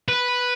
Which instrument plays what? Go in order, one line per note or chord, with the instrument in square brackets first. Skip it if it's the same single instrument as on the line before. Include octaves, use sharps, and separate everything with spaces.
[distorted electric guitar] B4